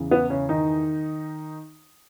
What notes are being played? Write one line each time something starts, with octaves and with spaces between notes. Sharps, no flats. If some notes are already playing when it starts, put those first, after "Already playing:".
Already playing: E2 C#3 E3
B3
C#3 C#4
D#3 D#4